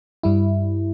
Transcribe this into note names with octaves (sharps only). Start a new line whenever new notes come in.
G2 G3 E4